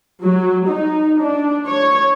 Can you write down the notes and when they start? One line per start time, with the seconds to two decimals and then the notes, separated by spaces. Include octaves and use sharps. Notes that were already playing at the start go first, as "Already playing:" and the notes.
0.22 F#3
0.67 D#4
1.21 D4
1.67 C#5